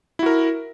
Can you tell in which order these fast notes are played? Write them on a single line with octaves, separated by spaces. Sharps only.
E4 F#4 A#4